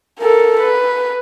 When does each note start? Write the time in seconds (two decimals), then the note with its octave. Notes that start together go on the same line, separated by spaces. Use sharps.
0.20 A4 A#4
0.60 B4